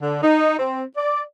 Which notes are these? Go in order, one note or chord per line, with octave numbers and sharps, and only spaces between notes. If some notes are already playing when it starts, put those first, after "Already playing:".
D3
D#4
C4
D5